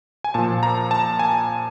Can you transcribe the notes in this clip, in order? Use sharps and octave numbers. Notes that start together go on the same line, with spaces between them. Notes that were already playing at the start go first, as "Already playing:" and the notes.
G#5
A#2 F3 A5
A#5
A5
G#5